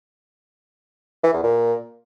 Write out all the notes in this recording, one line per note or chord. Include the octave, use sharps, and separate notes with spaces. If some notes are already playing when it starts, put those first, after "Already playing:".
E3
E2
A#2